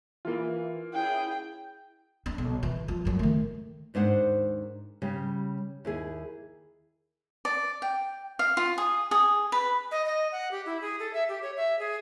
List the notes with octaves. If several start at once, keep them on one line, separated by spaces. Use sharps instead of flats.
E3 A#3 F4
C#4 E4 G#4 G5
D4
B1
E3
F3
F#2 F#3
D#3 A3
D#2 G#2 D4 C5 F#5
C#3 G3
D#2 E4 G#4
D5
G5
F5
F4
G#4
G#4
B4
D#5
D#5
F#5
G4
E4
G#4
A4
E5
G4
C#5
E5
G#4